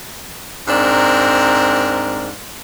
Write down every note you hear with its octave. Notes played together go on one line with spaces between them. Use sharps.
G#2 C4 D4 A#4